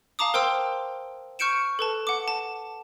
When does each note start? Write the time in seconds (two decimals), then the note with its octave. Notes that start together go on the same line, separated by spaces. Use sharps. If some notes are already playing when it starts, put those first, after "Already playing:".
0.19 F5 A5 A#5 D6 D#6
0.34 A#4 C5 G5 C6 E6
1.39 C#6 F6 G6 C#7 D7 E7
1.79 A4 B4 A5
2.07 F#5 D6
2.28 A5